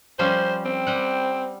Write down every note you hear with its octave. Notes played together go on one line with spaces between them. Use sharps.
F3 G3 C#4 C5
C4
G3 F#5